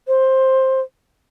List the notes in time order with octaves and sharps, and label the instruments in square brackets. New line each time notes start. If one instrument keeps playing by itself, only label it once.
[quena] C5